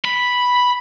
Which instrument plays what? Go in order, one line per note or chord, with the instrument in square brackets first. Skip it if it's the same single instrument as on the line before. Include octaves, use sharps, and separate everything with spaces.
[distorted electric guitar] B5